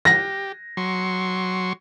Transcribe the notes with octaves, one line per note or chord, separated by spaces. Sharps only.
G4 A#6
F#3 C6 C#6